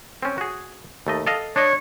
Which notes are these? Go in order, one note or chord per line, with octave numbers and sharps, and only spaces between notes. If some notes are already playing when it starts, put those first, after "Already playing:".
C4 C#4
F#4 G#4
D#2 A3 D#5
A4 D#5 F5
D4 C#5 D#5